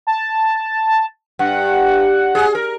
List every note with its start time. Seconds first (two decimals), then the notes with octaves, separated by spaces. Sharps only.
0.07 A5
1.39 G2 F#5
2.35 G#4
2.55 A#4